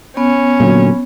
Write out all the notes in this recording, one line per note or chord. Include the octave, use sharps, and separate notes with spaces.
B3 C#4
A#2 D3 F#3